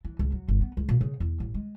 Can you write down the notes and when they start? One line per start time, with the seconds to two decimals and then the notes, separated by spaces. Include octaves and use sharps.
0.04 E3
0.19 C#2
0.32 F#3
0.48 G1
0.61 B3
0.77 C#2
0.89 A#2
1.01 C#3
1.20 E2
1.40 A1
1.54 G#3